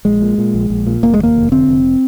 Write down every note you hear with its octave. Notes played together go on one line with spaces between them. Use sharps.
A#1 G#3
A#2
A#2
A#1
A#1
A#2
F1 A#3
G#3
D#2 A#3
F1
D3 C4
F1